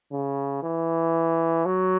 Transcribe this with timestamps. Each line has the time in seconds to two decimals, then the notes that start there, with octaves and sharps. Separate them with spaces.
0.12 C#3
0.63 E3
1.66 F#3